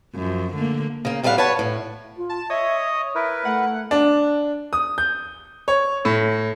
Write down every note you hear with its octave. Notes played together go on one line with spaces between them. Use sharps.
F#2 F3
D3 A3 A#3
C#3 A#3
A2 G3 A3 C#4 F5 F#5
B4 C#5 F#5 A5
A2
F4
A5
C#5 D#5 E5 D#6
E4 A#4 B4 E5
A3 F#5
D4
D#6
G6
C#5
A2